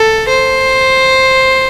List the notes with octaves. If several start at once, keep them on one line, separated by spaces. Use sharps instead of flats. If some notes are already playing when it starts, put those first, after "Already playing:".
Already playing: A4
C5